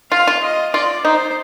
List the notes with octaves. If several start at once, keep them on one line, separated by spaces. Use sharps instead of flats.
F4 F5
F4
D#5
F4 D5
D#4 C5